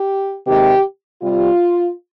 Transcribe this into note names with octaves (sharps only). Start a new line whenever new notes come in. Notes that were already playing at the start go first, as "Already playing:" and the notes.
Already playing: G4
C3 D#3 G#3 G4
C3 G3 F4